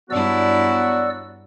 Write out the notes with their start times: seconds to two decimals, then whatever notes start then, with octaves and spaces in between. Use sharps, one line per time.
0.10 G2 F#3 B3 D4 E4 F#4 D5 E6